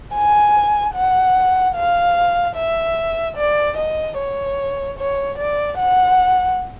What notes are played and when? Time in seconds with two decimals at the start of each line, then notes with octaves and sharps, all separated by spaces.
0.14 G#5
0.95 F#5
1.75 F5
2.55 E5
3.36 D5
3.77 D#5
4.17 C#5
4.98 C#5
5.38 D5
5.78 F#5